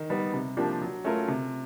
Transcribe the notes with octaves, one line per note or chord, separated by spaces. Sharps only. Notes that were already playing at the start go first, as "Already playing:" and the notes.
Already playing: D#3
G3 B3 D#4
C3
F3 A#3 D4 G4
F#3
A3 C#4 F4 A#4
C3